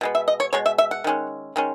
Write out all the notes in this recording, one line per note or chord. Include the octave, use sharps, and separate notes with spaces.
B2 G#3 B3
E5
D#5
C#5
B2 G#3 C#5
E5
E5
F#5
D#3 G#3 C#4
D#3 G#3 C#4